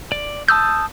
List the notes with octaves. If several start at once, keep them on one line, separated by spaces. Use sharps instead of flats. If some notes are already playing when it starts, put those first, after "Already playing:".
D5
A5 D#6 E6 G6